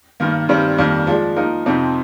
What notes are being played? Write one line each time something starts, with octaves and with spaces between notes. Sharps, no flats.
G2 D#3 A#3
G2 D#3 G3 C4
F2 D#3 G3 A#3
F3 G#3 D4
F3 A#3 D#4 A#4
F2 C3 F3 C4 D#4